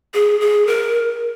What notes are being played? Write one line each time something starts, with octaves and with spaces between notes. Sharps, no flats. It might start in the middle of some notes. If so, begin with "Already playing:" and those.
G#4
G#4
A#4